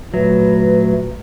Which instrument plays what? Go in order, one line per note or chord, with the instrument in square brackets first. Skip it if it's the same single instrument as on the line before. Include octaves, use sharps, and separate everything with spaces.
[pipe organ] A#2 A3 [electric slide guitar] F#3 [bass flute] B4